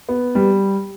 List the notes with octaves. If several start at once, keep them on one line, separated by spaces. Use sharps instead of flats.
B3
G3